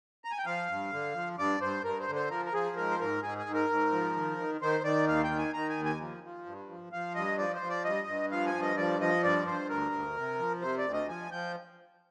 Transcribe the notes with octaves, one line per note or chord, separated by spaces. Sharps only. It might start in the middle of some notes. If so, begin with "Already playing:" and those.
A#5
G#5
G5
F3 F5
G2
D3
F3
G2 D5
G2 C5
G2 A#4
C5
D3
C5
F3 A#4
A#4
F3 G#4
G#2 A#4
C5
G#2 A#4
G#2 G#4
G#4
G#2
A#4
G#2
F3
D#3
D#3
D#3 C5
D#3 D5
D#2 F5
G5
D#3
G#5
D#3 A#5
G#5
D#2
G#5
F3
F3
G2
F3
F3 F5
G2 D#5
F3 D5
C5
F3
D5
G2 D#5
G2
F3 F5
G#5
G2
D#5
F3 D5
F3 D#5
G2 D5
G2 C5
D2 A#4
D2
C3
F3
C3 C5
D5
D2
D#5
F3 G#5
F3 G5